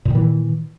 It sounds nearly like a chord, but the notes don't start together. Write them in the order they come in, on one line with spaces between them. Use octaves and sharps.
A#2 D#3 E3